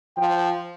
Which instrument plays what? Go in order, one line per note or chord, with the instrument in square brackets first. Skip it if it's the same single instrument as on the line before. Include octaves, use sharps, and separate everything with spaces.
[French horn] F3 [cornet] G5